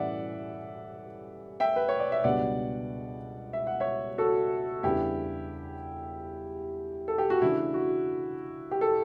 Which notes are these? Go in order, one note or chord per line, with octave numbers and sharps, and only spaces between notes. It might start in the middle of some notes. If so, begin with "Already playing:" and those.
Already playing: A2 E3 G3 C#4 D5 E5 F#5
E5 G5
B4
C#5
D5
E5
C#2 B2 G3 B3 D4 D5 F#5
E5
F#5
C#5 E5
F#4 A4
E2 C#3 G3 B3 D4 E4 G4
A4
G4
F#4
C#3 E3 A3 D4 E4
F#4
G4
A4